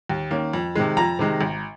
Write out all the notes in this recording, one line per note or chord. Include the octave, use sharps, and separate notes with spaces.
D#2
D#3 A#3 C#4
F2
C3 D#3 G#3
F2 A#5
C3 D#3 G#3
G#1